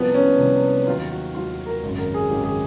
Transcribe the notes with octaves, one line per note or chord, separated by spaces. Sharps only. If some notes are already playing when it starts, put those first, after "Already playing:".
Already playing: C2 C3 F3 B3
C#4
C2 C3 F3
D#2 D#3 F#3 F4
F4
F#4
D#2 D#3 F#3 F4
F#4
A#4
G#1 F#2 C#3
A#4
G#4
G#1 F#2 C#3 G4
G#4